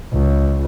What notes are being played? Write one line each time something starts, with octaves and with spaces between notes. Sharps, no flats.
C#2